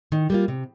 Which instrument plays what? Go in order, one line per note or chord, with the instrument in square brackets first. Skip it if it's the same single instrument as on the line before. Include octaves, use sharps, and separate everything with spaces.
[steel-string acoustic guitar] D#3
G3 A#3 F4
C3